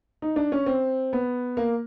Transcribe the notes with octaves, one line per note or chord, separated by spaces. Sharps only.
D#4
D4
C#4
C4
B3
A#3